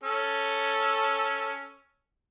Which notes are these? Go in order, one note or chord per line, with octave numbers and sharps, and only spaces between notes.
C#4 A4